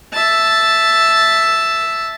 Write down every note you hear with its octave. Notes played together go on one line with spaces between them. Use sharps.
E5 A5